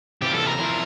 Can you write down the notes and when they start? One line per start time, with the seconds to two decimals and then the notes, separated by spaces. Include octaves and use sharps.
0.22 C3 E3 A#3 F4 G4
0.34 A4
0.47 A#4
0.59 F3 C4 E4